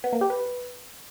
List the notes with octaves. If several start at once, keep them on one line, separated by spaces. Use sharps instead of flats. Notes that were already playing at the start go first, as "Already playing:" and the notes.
B3
A#3
G4
B4